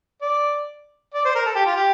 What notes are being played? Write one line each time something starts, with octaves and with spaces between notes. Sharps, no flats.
D5
D5
C5
A#4
A4
G4
F4
G4